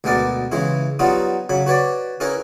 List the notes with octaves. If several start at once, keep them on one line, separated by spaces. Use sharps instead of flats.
D2 B2 G#3 B3 A#4 D5
C#3 E3 G#3 C#4 E4
F#3 G3 B3 D#4 F4 F#4
C#3 F#3 B5
F#4 B4 C#5 D5
C#4 E4 G#4 A#4 B4 E5